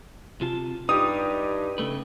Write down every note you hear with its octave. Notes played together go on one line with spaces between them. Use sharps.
C3 F4 A5
G2 D#4 G4 D#6
C#3 A3 B4